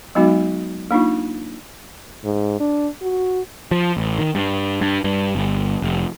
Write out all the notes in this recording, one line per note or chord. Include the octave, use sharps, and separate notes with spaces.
F#3 G#3 B3 D#4 F#4
A#3 D4 D#4 F4
G#2
D4
F#4
F3
A1
D#3
G2
G2
G2
G1
F1